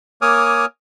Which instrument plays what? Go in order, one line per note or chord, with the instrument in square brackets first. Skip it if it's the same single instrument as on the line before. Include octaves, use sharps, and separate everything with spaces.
[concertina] A#3 C#5 G#5 D6 D#6 F6